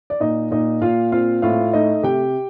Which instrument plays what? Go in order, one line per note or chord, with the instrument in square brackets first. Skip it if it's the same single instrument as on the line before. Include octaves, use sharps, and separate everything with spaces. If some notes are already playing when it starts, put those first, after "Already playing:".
[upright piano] D5
A#2 D#4 D#5
A#2 D#4 D#5
A#2 F4 F5
C4 F4 F5
A2 F4 F5
A3 D#4 D#5
C3 G4 G5